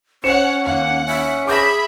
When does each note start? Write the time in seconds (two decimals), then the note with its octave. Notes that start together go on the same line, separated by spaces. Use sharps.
0.24 C#4 C5 C#5 F#5 C#7 E7
0.66 D#2 A#3 F#5
1.06 C#4 E5
1.47 G#4 E5 B5 D6 G6 A#6